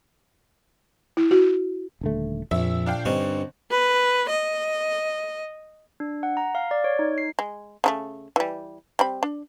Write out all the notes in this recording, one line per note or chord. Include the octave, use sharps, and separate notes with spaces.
E4
F#4
D#1 D3 A3
A#1 F2 E5
D4 F5 G5
G2 D3 C4 C#4 D#4
B4
D#5
D4
F#5
A#5
F5
D5
C#5
D#4
C7
G#3
C#3 F#3 A3
E3 G3
G3 C4 B5
D4